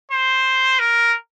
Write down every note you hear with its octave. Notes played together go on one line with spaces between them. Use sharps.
C5
A#4